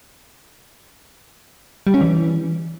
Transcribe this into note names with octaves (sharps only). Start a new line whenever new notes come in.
G3
C#4
E3